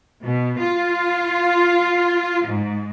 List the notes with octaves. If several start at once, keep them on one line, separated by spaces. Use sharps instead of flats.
B2
F4
G#2